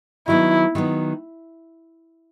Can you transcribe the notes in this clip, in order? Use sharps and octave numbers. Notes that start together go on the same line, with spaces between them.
D#3 F#3 B3 E4
D#3 F#3 B3